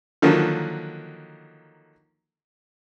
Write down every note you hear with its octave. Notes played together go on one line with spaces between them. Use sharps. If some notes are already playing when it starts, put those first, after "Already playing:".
D3 D#3 F3 F#3 A#3